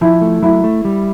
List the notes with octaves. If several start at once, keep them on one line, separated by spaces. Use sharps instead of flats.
F3 E4
A3
F#3 E4
A3
G3